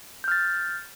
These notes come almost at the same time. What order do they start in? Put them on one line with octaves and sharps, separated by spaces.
G6 F6 A6